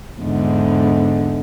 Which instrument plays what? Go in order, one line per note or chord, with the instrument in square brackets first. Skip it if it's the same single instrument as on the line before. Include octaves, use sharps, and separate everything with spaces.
[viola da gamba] E2 G#2 D3